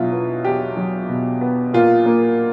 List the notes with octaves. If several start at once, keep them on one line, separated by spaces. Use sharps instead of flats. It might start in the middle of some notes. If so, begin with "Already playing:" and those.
Already playing: E2 B2 F#3 E4 F4
B3
E2 G4
F#3
B2
B3
A#2 F4
A#3